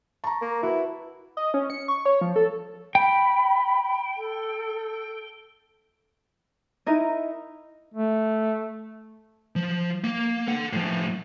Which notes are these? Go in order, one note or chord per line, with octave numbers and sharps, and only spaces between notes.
A5 A#5 C#6
A#3
E4 F#4 B4
D#5
C#4
C#7
C#6
C#5
F3
A4
G5 B5
A4
D#4 E4 A#4 D#5
A3
F3
A#3
A4 F#5
A2 F3